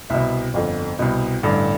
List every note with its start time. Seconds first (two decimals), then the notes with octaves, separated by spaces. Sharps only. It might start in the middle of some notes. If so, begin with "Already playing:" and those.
0.10 C2 B2 E5
0.54 G1 F2 D3
0.99 C2 B2
1.43 A1 G2 D3